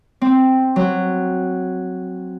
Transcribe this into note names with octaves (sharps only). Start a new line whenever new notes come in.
C4
F#3